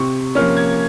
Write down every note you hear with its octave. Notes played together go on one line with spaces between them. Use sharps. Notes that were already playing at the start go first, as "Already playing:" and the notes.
Already playing: C3 C#6
F3 A#3 C#4 F6
G#6